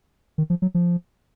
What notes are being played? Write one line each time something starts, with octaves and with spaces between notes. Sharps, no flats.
D#3
F3
F#3
F3